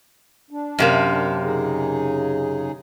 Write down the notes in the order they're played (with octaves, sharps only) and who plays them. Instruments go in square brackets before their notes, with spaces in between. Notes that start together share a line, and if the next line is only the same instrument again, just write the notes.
[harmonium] D4
[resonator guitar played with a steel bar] F#2 C3 A#3
[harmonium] C#3 D#4 G#4